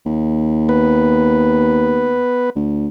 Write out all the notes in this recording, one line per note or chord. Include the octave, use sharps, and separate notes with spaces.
D#2
B3 B4
D2